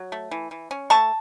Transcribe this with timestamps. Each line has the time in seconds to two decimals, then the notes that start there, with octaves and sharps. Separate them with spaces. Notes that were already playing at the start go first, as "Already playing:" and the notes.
Already playing: F#3
0.12 A3
0.31 E3
0.51 E3
0.71 C#4
0.90 A3 A5 C#6